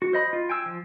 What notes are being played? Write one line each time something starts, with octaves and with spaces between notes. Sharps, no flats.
F#4
C5 D#5 B5
F4
G5 G#5 E6
F3